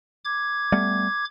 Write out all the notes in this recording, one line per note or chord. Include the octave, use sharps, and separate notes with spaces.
D6 G#6
G3 A3 B3